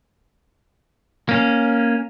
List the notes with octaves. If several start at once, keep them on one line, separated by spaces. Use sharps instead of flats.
A#3 C#4